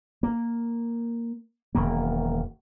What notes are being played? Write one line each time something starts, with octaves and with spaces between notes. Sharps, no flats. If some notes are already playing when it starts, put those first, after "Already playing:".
A#3
E1 F#2 D#3 A#3